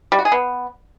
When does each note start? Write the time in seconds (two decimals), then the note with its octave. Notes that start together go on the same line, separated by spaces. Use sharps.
0.12 G3
0.19 F#4
0.25 G#4
0.32 B3